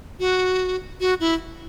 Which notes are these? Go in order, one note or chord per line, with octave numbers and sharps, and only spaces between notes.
F#4
F#4
E4